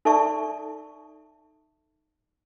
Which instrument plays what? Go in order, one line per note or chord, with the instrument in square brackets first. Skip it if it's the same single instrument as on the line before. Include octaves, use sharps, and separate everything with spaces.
[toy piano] D#4 A4 D5 E5 A5 C#6